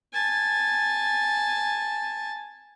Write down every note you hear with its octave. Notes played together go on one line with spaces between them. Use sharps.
G#5 A5